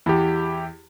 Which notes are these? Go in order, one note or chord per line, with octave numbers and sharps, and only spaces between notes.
E2 E4 G4